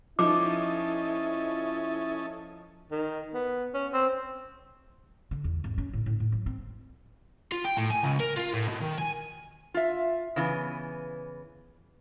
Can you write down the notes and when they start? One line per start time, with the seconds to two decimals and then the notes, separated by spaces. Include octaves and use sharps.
0.19 F3 C#4 D#4 E4 A4 D6 D#6
2.91 D#3
3.34 B3
3.74 C#4
3.93 C4
5.31 D3
5.44 E2
5.64 G#1
5.78 C#4
5.93 A2
6.06 A2
6.20 A2
6.32 F#3
6.46 C4
7.52 F4
7.65 G5
7.78 A2
7.91 G#5
8.04 C#2
8.20 A#4
8.37 F4
8.54 A2
8.68 B2
8.81 D#3
8.98 G#5
9.74 F4 E5
10.36 C#3 E3 B3